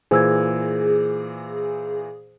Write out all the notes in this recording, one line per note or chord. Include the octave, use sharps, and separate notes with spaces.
A#2 E3 G#4 C5 E6 G#6